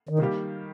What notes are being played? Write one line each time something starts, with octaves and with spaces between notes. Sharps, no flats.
D#3
C3 D#3 G3 A#3 G4